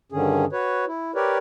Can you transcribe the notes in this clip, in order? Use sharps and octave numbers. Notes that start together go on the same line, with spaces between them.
G2 D3 D#3 C#4 G#4
F#4 B4 C#5
E4
G4 A#4 B4 C#5 D5